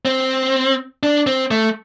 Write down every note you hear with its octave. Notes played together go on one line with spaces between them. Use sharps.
C4
D4
C4
A3